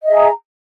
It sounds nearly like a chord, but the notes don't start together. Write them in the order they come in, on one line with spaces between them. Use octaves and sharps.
D#5 E5 G#4 A#5